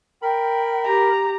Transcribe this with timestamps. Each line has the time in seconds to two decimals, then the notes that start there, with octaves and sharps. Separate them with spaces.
0.22 A#4 G5 B5
0.85 G4 A#5